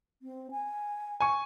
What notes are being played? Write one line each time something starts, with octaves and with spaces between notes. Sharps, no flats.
C4
G#5
G#5 C#6